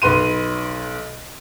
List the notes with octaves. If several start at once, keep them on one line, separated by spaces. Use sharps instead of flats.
B1 B4 C6 D#7